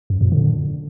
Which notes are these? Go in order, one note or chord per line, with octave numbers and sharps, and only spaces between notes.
F#2
A#2
D3